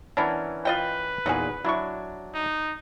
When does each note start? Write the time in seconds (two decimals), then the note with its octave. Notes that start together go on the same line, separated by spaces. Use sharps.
0.17 E3 B3 C#4 D4 A#4
0.65 F4 B4 D#5 G5
1.26 E2 A#2 D#4 F#4 G#4
1.65 F#3 D4 E4 C#6
2.34 D#4